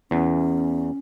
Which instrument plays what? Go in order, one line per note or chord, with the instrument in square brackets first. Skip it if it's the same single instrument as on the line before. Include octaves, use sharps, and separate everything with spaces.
[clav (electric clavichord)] E2 [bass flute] C#4